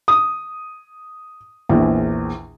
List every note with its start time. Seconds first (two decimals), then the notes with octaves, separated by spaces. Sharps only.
0.08 D#6
1.69 A#1 E2